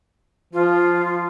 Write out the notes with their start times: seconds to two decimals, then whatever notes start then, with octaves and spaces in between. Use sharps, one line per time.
0.53 F3 F4